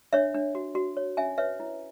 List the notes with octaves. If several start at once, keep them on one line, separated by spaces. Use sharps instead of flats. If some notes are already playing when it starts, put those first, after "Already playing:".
D4 C#5 E5
D4
F#4
F#4
C#5
C#4 E5 G#5
B4 C#5 E5
E4